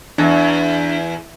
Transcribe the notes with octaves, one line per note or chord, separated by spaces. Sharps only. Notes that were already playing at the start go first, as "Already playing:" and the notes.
E2 D4